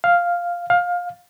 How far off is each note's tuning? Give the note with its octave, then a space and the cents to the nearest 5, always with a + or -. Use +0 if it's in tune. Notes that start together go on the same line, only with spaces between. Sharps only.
F5 +0
F5 +20